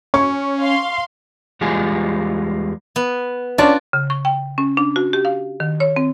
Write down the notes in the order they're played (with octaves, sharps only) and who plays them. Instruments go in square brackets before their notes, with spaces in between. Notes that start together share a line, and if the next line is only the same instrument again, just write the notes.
[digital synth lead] C#4 [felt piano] C#6
[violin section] F5 C6
[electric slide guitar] E2 G3 G#3 F4 G#5
[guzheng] B3
[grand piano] C#4 D4 A5 [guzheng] F4 F#4 D5
[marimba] C#3
C#6
G5
C#4
D4
F#4
G4
F5
D#3
C#5
C4